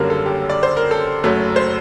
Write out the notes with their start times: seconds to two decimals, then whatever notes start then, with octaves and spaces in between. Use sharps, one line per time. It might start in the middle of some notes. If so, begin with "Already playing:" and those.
Already playing: F#1 F#2 D3 G3 A#3 A#4
0.10 A4
0.26 G4
0.50 D5
0.63 C5
0.77 A#4
0.91 A4
1.24 F#1 F#2 F#3 A3
1.56 C5